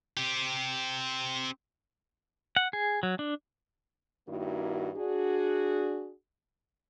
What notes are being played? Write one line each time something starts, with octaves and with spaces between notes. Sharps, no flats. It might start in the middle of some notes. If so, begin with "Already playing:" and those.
C4 G4
F#5
G#4
F#3
D4
G2 D#3 A#3 E4 F#4
D4 F#4 G#4